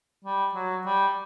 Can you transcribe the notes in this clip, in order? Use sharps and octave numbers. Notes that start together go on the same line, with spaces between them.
G3
F#3
G3